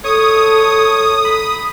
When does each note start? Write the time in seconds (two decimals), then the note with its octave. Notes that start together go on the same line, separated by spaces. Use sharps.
0.04 A4 C#5 D#6
1.25 B5